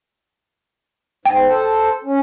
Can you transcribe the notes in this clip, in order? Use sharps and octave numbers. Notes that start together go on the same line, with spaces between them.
G#2 G5
A4 C5
C#4